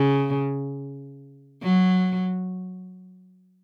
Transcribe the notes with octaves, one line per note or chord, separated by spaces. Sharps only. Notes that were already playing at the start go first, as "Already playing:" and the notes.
Already playing: C#3
F#3